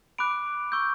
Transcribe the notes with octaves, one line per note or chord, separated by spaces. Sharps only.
B5 D6 F#6 D7
C#6 E6 G6